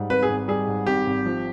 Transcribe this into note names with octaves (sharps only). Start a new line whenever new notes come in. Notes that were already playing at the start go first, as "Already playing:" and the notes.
Already playing: G#2 G3
G#1 B4
G#4
G#1
G3 G#4
G#2
G#1 G4
G#1
F3